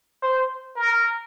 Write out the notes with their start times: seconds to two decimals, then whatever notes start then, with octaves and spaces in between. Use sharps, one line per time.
0.23 C5
0.76 A#4